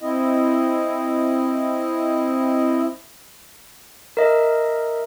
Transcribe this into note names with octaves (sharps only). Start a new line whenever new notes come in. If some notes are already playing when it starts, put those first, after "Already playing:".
C4 E4 D#5
A#4 D#5 E5